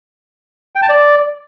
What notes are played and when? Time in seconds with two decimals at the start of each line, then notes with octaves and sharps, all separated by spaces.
0.76 G5
0.82 A5
0.89 D5